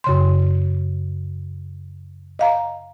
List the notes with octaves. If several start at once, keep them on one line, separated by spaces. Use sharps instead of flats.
F#2 C#3 C6
D#5 F5 A#5